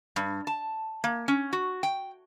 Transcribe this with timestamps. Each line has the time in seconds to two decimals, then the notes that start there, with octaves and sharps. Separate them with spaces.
0.16 G2
0.47 A5
1.04 A#3
1.28 C#4
1.53 F#4
1.83 G5